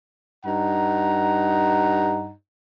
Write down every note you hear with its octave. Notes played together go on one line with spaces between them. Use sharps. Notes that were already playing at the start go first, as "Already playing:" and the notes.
G2 D#4 F#5 A#5